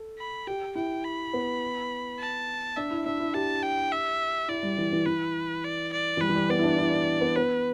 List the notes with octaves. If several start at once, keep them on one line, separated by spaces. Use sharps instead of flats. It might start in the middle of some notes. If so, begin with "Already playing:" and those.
Already playing: A4
B5
G4 G5
E4 G5
B5
B3
A5
D4 E5
E4
D4 E5
E4
G4 A5
G5
E5
E4 D5
G3
E3
E3
E3 B4
D5
D5
E3
G3 B4
E3
G3
B3 D5
E4
D4
E4
D4
B3
B3 B4